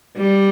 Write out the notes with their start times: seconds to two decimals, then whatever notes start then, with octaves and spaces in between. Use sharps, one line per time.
0.17 G3